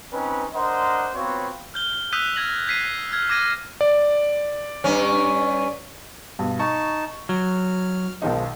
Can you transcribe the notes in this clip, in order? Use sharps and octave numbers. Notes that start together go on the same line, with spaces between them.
C4 C#4 D#4 B4
D4 A#4 C5 D#5 F#5 C6
B3 C4 F4 F#4 B4 C#5
F6 G6 G7
D#6 E6 F#6 G6 B6 D#7
F6 G#6 A#6 F#7
G6 G#6 B6 C7 D#7
F6 G#6
D6 F6 G#6 A#6 D#7 E7
D5
G2 C#4
G2 B2
D#4 A5 C#6
F#3 F6
B1 D#3 F3 G#3 D#4